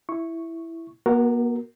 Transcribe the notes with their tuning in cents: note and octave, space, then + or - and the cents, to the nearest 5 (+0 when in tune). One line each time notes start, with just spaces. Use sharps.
E4 +5 C#6 +0
A#3 +40 F#4 +0 A#4 -15